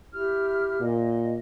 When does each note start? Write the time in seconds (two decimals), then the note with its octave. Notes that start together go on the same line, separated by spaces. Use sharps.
0.12 E4 G4 F6
0.80 A#2 D#5